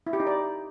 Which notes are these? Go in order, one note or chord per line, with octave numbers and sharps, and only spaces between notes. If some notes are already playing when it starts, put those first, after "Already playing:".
E4
G4
D#4
D5